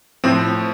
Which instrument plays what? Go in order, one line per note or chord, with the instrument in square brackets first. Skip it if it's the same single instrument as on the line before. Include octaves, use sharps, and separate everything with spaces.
[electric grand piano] A2 F3 C4